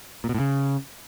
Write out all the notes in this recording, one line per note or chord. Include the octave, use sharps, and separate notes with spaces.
A#2
B2
A2
C#3